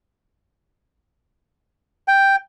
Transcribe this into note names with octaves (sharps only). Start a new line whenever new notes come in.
G5